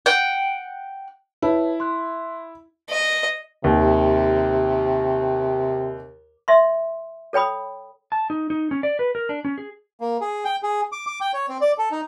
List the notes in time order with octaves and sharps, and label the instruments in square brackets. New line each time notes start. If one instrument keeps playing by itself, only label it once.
[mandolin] F#5 G5
[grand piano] E4 [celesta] B4 C#5 A5
[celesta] C6 F#6
[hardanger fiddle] D#5
[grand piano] D#2 [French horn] C3
[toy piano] D#5 E5 C6
A4 C#5 G5 B5 D#6
[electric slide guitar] A5
D#4
D#4
C#4
D5
B4
A#4
D4
C#4
G#4
[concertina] A#3
G#4
G5
G#4
D6
D6
G5
C#5
C4
D5
A4
D#4